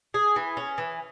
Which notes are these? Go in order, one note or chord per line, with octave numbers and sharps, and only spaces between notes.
G#4
E3
C#4
E3